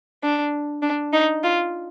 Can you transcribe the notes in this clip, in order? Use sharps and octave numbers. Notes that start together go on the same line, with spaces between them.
D4
D4
D#4
F4